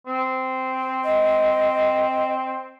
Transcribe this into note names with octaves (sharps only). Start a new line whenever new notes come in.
C4
D#5